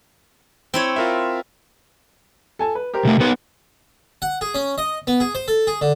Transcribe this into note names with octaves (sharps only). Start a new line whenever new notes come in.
C4 E4 C#5
F4 A#4 E5
A4 G#5 A5
B4
G4 A#4 C5
C3 A3
B3 D#4 B4
F#5
G#4
C#4
D#5
B3
G#4
C5
A4
G#4
D3